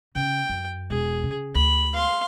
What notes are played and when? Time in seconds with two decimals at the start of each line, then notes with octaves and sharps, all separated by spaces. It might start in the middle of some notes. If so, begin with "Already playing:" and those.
0.15 C#3 G5
0.49 F#2
0.90 E1 G#4
1.24 C#3
1.55 D2 B5
1.94 F5 C6